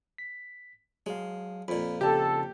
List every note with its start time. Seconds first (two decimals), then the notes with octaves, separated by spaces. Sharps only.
0.18 B6
1.06 F#3 G#3 F5
1.68 F2 A#2 B5
2.01 C#3 G4 A4 A5